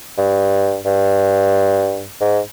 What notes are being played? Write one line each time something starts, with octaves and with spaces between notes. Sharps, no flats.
G2
G2
G#2